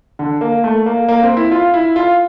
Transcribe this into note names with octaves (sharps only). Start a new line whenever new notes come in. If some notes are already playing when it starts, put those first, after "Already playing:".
D3
A#3
A3
A#3
A#3
C4
E4
F4
E4
F4